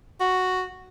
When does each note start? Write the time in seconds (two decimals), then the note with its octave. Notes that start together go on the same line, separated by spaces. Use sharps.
0.20 F#4